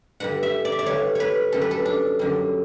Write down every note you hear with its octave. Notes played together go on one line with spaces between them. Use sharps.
G2 D3 G3 F#5
E5
D5
E5
D5
G2 D3 G3 C#5
B4 C#5
F#2 D3 G3 A4
B4
A4
D4
F#2 D3 G3